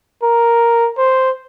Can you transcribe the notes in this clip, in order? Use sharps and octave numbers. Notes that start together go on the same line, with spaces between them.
A#4
C5